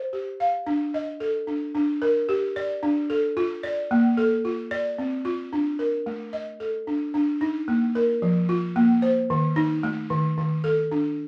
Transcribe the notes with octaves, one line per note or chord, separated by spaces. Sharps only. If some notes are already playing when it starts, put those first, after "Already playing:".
Already playing: C5
G4
F5
D4
D#5
A4
D4
D4
A#4
G4
D5
D4
A4
F4
D5
A#3
A4
F4
D5
C4
F4
D4
A#4
A3
D#5
A4
D4
D4
D#4
A#3
A#4
F3
F4
A#3
C5
D#3
D#4
A3
D#3
D#3
A4
D4